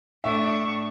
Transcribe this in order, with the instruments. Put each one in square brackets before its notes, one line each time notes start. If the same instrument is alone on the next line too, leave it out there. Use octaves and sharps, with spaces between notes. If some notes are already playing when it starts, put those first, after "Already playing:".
[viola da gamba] A2 D4 [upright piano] E5 [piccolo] C#6